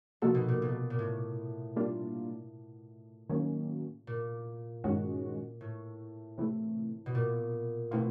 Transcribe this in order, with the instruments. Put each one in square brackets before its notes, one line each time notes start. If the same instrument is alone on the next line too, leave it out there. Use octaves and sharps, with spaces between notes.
[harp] C3 [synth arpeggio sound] F3 A#3 D#4 F#4 A4
[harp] B2
A#2
B2
A#2
A2
[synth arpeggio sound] G3 A#3 D4 F4
D#3 F#3 A#3 C#4
[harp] A#2
[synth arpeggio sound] G2 D#3 G#3 C#4 F#4
[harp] A2
[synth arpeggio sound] C3 E3 A3
[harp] B2
A#2
[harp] B2 [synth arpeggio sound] E3 A3 C4 F4